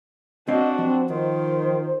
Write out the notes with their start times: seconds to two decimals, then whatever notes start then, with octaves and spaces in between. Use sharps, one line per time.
0.48 C4 D4 F#4 C#5 D#5 F5
0.79 F3 C4
1.09 D#3 F4 C5